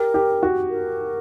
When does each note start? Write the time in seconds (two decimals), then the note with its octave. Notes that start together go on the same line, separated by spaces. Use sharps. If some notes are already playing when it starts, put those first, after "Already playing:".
Already playing: G4 A#4
0.14 G4
0.43 F#4
0.70 A#4